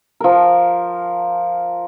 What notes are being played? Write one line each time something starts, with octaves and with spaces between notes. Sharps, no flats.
F3 A#4